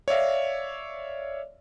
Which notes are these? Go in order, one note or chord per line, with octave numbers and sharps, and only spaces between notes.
C#5 D5 E5 F5